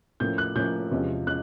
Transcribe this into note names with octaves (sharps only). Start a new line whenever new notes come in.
A2 F3 A#3 C#4 G6
F#6
A2 F3 A#3 C#4 G6
E2 C3 F3 G#3 C#4
G#3 C#4 F#6